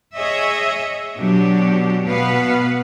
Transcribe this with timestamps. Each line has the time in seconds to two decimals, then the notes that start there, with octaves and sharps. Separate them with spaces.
0.16 G#4 C#5 D#5 E5
1.17 B2 F#3 D4 G4
2.05 B2 B3 B4 F5